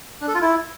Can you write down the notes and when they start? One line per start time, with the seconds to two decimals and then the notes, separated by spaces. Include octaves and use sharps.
0.21 D4
0.28 A4
0.35 F4
0.41 E4